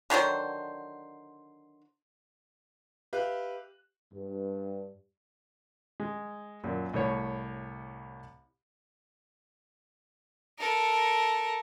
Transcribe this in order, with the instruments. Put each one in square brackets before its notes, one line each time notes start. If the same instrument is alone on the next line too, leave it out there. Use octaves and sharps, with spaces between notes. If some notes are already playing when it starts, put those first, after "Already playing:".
[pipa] D3 D#3 F#3 C5
[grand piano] G4 B4 E5 F5 F#6
[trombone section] G2
[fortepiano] G#3
F#2 A#2
C2 A2 C#5
[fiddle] A4 A#4